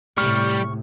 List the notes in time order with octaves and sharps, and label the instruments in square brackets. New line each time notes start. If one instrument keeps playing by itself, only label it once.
[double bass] A2 C3 [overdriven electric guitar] G3 [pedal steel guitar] C#6 F6